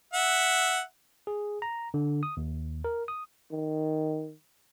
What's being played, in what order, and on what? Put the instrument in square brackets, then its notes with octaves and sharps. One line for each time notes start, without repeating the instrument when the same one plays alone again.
[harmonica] E5 F#5
[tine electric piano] G#4
A#5
D3
D#6
D#2
A#4
D#6
[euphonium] D#3